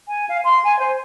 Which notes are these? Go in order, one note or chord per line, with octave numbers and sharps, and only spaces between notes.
G#5
F5
C6
G#5
C5